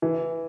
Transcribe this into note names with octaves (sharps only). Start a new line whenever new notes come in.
E3